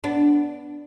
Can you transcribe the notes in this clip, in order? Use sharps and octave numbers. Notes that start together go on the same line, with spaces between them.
B3 D4